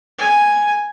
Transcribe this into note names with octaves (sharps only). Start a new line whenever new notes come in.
G#5